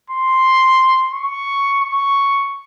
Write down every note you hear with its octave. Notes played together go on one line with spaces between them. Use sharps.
C6
C#6
C#6